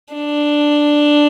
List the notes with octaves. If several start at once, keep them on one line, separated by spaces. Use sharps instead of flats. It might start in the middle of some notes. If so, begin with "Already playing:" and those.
D4